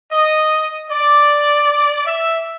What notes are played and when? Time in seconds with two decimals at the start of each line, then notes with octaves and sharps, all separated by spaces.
0.11 D#5
0.90 D5
2.06 E5